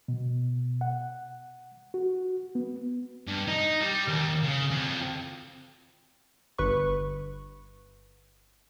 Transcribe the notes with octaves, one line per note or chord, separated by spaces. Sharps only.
B2
F#5
F#4
B3
G2
D#4
G3
D#2
C#3
F2
G1 B4 C#6